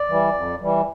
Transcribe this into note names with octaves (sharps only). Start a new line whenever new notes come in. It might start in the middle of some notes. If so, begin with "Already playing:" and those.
Already playing: D5
E3 G3
F2
E3 G3